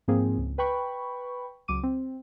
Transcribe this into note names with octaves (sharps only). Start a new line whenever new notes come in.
G#2 F3 A#3 C4 G#4
C#2
B4 G5 B5 C#6
C#2 F#3 D6 D#7
C4